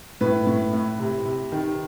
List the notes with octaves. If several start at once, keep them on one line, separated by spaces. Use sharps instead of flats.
A2 B4
A2
A2
C3
C3
D#3